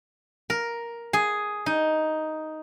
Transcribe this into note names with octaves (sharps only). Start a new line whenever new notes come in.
A#4
G#4
D#4